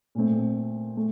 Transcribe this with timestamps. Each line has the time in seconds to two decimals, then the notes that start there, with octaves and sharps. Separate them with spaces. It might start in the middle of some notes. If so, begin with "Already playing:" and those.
0.15 A#2 A3 C4
0.97 A3